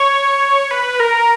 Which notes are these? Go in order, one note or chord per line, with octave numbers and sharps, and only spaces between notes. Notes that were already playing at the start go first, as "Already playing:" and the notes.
Already playing: C#5
B4
A#4